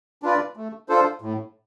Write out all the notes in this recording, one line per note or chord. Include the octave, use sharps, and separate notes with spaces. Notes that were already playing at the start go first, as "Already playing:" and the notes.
D4 F4 B4 D5
A3
D4 F4 A4 C5
A2